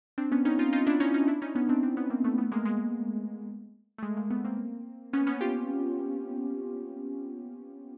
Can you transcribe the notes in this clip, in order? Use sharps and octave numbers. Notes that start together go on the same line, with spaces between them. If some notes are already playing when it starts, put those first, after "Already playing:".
C4 D4
B3 C#4
C#4 D#4
D#4 F4
D#4 F4
D4 E4
C#4 D#4
C#4 D#4
D4 E4
C#4 D#4
B3 C#4
C4 D4
C4 D4
B3 C#4
A#3 C4
A3 B3
A3 B3
G#3 A#3
G#3
A3
G#3
G#3 A#3
A3 B3
A#3 C4
B3 C#4
B3 C#4
F4 G4